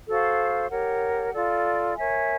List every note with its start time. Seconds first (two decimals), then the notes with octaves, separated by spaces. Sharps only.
0.08 F#4 A4 C5 F5
0.70 G4 A#4 C#5 F#5
1.33 F4 A4 D5
1.96 A#4 C#5 E5 G#5